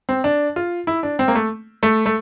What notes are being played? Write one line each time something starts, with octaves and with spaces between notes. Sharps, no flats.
C4
D4
F4
E4
D4
C4
A#3
A3
A3
A3